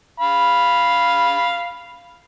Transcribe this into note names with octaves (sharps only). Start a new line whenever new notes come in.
F5 B5